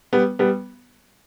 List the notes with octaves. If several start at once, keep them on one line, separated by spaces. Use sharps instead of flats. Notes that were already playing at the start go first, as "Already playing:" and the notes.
G3 B3
G3 B3